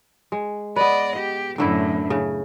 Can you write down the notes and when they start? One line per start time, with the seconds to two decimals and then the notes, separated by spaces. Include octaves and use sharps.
0.32 G#3
0.76 B3 B4 D5 D#5
1.16 G4
1.58 F#2 A2 D3 A3 E4
2.10 C#3